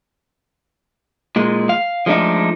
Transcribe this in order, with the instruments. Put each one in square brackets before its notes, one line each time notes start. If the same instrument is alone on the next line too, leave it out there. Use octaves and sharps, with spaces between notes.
[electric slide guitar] A#2 G#3
F5
F3 G#3 A3 C4 D4 D#4